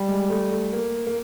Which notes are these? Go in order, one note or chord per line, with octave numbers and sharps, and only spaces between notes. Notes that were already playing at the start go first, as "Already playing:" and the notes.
Already playing: G3
G#3
A3
A3
A#3
A#3